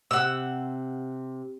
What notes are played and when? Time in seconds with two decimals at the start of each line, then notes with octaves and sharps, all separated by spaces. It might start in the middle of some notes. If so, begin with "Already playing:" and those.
0.11 C3 F#5 E6